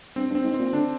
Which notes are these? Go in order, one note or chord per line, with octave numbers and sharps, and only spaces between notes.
G2 C4
G2
C4
G#2
C4
A#2
D3 D4